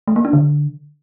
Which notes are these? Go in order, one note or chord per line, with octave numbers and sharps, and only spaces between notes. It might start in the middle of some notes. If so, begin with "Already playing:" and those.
A3
A#3
D4
D3